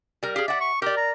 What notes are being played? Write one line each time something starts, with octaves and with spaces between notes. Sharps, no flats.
G3 A#4
G4 G#4 F5
D5 E5 F#5
C#6
G4 A#4 D5
A#5